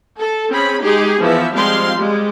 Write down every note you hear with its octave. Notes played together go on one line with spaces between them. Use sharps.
A4
C4 C#4 G#4 B5
G#3 D#4 G4 G#4
E3 F3 B3 E5
F3 G3 G#3 C4 F5 C6
G3 G#3